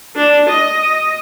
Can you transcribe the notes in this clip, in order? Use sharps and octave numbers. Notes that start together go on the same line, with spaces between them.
D4
D#5